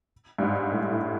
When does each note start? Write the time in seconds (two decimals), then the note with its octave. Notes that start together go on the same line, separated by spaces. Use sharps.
0.38 G2
0.42 G#2
0.71 A2
0.91 A2